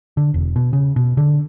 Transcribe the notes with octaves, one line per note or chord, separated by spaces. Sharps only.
D3
E1
B2
C#3
B2
D3